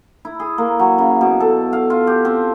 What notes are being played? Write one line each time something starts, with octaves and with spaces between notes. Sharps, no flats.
E4
G#4
A#3
F#3
C#3
B2
A4
F5
F4
G4
C4